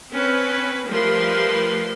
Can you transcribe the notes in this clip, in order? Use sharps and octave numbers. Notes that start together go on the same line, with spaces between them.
C4 C#4 B4
F3 G3 A3 A#4 B4 C6